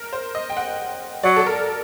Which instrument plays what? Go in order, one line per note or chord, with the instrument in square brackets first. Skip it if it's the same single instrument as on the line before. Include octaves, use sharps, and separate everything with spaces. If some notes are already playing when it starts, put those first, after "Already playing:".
Already playing: [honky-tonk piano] A#4
C5
D#5
G5
F#5
[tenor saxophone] F#3 [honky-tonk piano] D5
[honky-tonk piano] A4
A#4